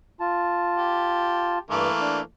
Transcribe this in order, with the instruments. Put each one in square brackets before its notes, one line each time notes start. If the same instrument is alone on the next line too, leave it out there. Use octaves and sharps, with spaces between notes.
[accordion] F4 A5
[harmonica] G4
[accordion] G2 D6 [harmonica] E3 A3 A#3
[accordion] D4